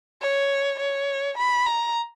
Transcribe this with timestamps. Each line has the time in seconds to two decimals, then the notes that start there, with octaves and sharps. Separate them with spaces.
0.22 C#5
0.79 C#5
1.38 B5
1.66 A#5